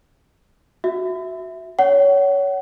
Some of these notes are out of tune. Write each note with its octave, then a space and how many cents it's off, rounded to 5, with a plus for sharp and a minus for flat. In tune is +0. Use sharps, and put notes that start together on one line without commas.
F#4 -5 E5 +0
C#5 +20 F#5 +30